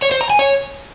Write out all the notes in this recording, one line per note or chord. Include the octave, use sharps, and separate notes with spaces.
C#5
C5
A#5
G#5
C#5